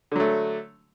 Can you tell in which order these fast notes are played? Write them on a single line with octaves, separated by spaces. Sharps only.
D3 F#3 A3